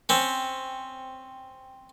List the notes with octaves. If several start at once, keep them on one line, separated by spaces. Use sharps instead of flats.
C4 C#4